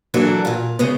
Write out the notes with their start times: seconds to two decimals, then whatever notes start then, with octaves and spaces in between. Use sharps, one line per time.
0.14 E3 F#3 A#3 D4 F#4 A4
0.45 A#2 F4
0.79 C#3 G#3 B3